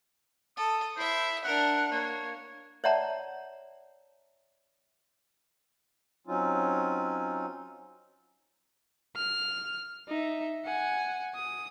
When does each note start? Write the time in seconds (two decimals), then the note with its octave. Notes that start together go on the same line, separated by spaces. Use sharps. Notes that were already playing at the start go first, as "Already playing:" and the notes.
0.57 A4 D#6
0.97 E4 C5 E5
1.44 D4 A#4 F#5
1.92 A#3 C#5
2.84 C#5 D5 E5 F#5 A5 A#5
6.27 F#3 C4 C#4 D#4 F4
9.16 F6
10.08 D#4 E5
10.65 F#5 G#5
11.35 D#6